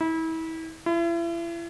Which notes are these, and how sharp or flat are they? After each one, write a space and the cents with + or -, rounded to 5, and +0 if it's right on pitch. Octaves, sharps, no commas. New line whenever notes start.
E4 -30
E4 +40